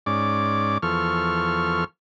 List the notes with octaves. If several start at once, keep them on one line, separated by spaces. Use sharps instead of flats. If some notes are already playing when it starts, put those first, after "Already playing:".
G#2 C#4 D5 D6
E2 F3 A4 C#6 F6